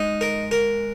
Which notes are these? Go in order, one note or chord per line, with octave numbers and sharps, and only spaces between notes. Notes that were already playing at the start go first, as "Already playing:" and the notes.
Already playing: G#3 D#4
A#4
A#4